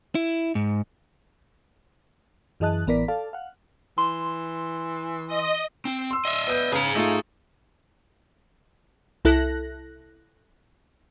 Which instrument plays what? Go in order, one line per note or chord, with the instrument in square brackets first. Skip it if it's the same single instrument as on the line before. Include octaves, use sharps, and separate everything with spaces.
[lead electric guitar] E4
G#2
[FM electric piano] F#2 E3 G#4 D#5 A5 F#6
A1 E3 B3 A#4 D5 B6
A4 D5 F5 A5
F5 F#5
[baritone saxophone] E3 [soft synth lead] C6
[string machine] D#5
[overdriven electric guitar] C4
[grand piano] C6 E6
[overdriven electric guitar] D#5 E5
[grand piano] B3 G6
[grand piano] C#3 [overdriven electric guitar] G#4 A#5
[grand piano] A3 D#4 F4
[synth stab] C2 E4 A4 F#6 A#6